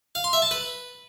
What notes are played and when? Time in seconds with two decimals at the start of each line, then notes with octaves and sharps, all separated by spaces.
0.15 F5
0.24 C6
0.33 E5
0.42 A5
0.51 B4